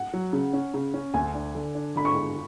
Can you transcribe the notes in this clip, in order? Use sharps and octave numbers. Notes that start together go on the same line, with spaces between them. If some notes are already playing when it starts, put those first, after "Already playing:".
Already playing: F#5
F#3
C#3
C#4
C#3
C#4
D2 G#5
D4
D3
D4
D3 B5
C#6
G#3